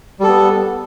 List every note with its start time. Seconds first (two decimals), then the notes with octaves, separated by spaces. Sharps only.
0.20 G3
0.24 A4
0.28 B3